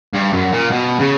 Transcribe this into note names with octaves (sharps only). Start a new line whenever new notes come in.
G2
F#2
A#2
B2
C#3